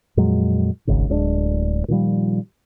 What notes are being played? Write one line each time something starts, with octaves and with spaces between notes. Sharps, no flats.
F2 A#2 F#3 G#3
D#1 G#1 G#2 C#3
D1 G#3 C4 D4
A#2 D#3 F3 G3